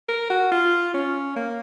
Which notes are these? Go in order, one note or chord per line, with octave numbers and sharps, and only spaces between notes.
A#4
F#4
F4
C#4
A#3